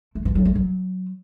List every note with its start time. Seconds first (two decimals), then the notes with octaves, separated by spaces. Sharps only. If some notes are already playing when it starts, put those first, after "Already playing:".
0.15 A3
0.25 E3
0.35 F#3
0.45 A3
0.55 F#3